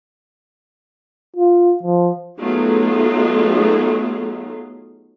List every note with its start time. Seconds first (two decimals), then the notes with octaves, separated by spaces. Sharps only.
1.36 F4
1.83 F3
2.38 F#3 A3 B3 D#4 F4 G#4